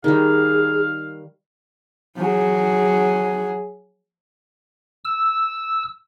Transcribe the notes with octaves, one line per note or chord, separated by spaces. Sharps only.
D#3 G3 G#4 F5
F#3 G#4
E6